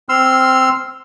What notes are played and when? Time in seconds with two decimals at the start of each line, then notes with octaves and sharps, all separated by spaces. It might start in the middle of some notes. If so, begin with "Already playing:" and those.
0.09 C4 C6 E6 F6